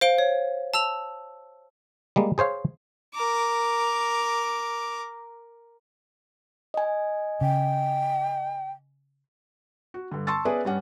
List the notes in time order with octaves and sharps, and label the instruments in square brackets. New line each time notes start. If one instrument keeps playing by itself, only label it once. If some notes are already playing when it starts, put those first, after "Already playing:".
[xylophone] C5 F5 D7 G7
C#5
A5 E6 F7
[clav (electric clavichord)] G3 G#3 A#3
G#4 C5 C#5 F5
[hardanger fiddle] A#4 D6
[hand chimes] D#5 G#5
[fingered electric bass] C#3 [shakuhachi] G5
[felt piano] F#4
G2 D3
A5 C6 C#6 E6 A6
B3 C#4 G#4 B4 D5 E5
G2 G3 C#4 F#5